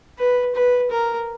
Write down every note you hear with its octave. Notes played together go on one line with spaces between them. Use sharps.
B4
B4
A#4